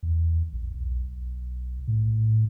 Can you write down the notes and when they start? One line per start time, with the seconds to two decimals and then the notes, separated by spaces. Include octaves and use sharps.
0.03 E2
0.53 A#1
0.73 B1
1.88 A2